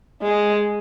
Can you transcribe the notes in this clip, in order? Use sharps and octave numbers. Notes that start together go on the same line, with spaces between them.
G#3